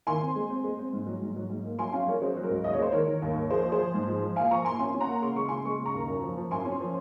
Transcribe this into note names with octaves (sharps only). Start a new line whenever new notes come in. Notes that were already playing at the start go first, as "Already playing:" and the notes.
D#3 G#5 C6
C4
G#3
C4
G#3
C4
G#2
F#3
G#2
F#3
G#2
A#3
F#3 G#5 C6
C#4 F5 G#5
F#3 A#4 C#5
C#4 G#4 C5
F#3
F#4 A#4
C#2
D#2 D#5
C#5
G#3 C5
D#3 A#4 C#5
D#3
D#2
D#2
F3 G#4 C5
F3
G#4 C5
F3
G#2
F3
F3
A#2 F5 G#5
F3 A#5 C#6
A#2 G#5 C6
C#4 G#5 C6
C#4
F#5 A#5
A#3
C#3 C6
G#3 C#6
C#3 G#5 C6
G#3 C#6
C#3
A#5 C#6
D#2
F#2
F3
F3
F#2 G#5 C6
C#4
F3